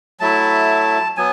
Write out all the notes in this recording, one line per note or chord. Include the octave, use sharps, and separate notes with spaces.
F#3 A3 E4 A5
F#3 B3 G#5